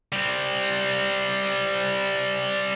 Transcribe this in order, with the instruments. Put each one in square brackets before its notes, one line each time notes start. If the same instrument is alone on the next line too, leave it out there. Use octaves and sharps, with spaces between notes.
[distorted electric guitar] G3 C4